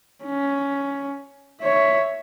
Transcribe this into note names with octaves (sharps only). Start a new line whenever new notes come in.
C#4
C#5 E5